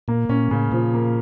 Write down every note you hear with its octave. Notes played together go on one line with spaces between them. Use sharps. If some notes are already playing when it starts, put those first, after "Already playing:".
A#2 A#3
A#2 C#4
A2 C#3
A#2 F3
A#3